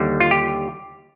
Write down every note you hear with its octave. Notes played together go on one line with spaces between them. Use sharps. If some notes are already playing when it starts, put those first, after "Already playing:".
Already playing: D#2 D3 G3
F4
G4